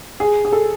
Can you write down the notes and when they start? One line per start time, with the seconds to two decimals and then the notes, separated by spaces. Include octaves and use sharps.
0.20 G#4
0.45 G#4
0.52 A4